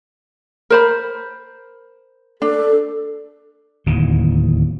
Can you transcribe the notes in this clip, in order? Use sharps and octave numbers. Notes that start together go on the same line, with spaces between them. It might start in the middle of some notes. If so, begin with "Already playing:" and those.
A#4 C5 B5
D4 A4
D1 D#2 C#3 E3